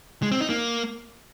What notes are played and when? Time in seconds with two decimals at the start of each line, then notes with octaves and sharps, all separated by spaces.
0.23 G#3
0.32 C4
0.41 D#4
0.50 A#3